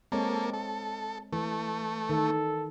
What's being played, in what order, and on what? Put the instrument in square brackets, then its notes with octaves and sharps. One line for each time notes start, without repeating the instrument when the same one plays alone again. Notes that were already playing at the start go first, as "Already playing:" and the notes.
[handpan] G#3 C4 C#5 [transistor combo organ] A#3 A4
[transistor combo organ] A4
[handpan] E3 [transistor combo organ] A3
[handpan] D#3 [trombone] A4